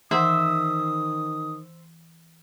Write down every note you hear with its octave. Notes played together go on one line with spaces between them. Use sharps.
D#3 E3 C5 E5 F#5 C6 D#6